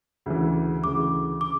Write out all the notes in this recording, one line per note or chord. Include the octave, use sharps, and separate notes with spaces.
D2 C#3 E3
D2 C#3 E3 D6
C#3 D6